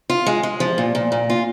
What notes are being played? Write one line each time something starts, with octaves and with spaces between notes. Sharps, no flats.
F4
G#3
G#3
F3
A#2
A#2
A#2
F4